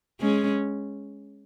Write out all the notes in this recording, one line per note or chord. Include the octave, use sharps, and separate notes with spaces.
G#3 C#4